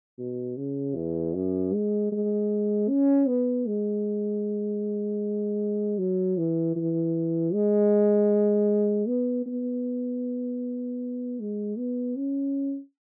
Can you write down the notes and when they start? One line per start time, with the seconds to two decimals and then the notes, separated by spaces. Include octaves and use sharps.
0.19 B2
0.57 C#3
0.96 E2
1.34 F#2
1.74 G#3
2.12 G#3
2.89 C#4
3.28 B3
3.67 G#3
5.98 F#3
6.37 E3
6.76 E3
7.54 G#3
9.08 B3
9.46 B3
11.40 G#3
11.78 B3
12.16 C#4